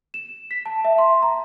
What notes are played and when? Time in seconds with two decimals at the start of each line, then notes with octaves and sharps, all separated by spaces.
0.14 E7
0.51 B6
0.66 A5
0.85 E5
0.98 C6
1.22 A#5